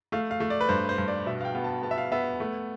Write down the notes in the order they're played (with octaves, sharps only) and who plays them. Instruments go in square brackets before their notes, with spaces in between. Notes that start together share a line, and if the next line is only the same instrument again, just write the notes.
[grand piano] A3 F5
F5
A3
D5
B4
G2 C5
C5
G2
D5
B2 E5
F5
G5
B3
A5
B3 A5
E5
F5
B3 E5
A3